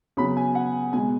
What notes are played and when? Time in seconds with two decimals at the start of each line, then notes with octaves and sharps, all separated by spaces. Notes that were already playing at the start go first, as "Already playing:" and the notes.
0.17 C#3 F#3 B3 B5
0.37 G#5
0.55 F#5
0.93 B2 G#3 B3 G#5